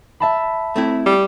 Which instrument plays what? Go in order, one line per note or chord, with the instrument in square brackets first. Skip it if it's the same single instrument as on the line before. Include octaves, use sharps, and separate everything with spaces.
[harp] E5 A5 B5
[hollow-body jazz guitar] A3 C4 E4
[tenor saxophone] G3